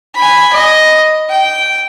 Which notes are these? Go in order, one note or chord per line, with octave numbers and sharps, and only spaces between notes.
G#5 B5
D#5
G5